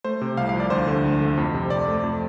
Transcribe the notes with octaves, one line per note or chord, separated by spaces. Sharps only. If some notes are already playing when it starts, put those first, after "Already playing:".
A3 C5
C3
C2 F5
F3 F5
D5
D2 C5
D3
D2
A3
F2
C3
F2 D5
A3
F2